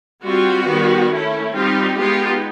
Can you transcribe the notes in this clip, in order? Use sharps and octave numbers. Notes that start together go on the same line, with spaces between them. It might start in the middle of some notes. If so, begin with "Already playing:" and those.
G3 C4 F4 F#4
D#3 G3 B3
A3 C#4 E4
G3 C4 D#4 F4 G4
G#3 B3 D#4 F4 G4